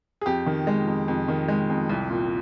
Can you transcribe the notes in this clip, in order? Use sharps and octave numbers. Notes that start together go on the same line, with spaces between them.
G#4
F2 G4
D#3
G#3
F2
F2
D#3
G#3
F2
C2
A#2